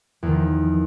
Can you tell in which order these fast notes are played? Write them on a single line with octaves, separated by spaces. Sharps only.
E2 D#3 F3